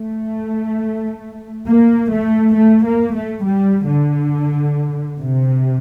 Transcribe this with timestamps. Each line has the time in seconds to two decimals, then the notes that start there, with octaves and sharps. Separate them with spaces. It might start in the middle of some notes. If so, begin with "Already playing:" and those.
Already playing: A3
1.67 A#3
2.12 A3
2.55 A3
2.85 A#3
3.14 A3
3.44 G3
3.87 D3
5.19 C3